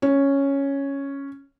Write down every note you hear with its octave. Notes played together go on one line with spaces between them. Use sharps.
C#4